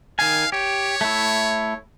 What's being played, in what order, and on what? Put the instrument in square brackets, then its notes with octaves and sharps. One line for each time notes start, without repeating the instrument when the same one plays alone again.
[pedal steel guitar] D#3 G#5 [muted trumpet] F5
[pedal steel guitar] G4 [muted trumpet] C#5
[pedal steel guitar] A3 E4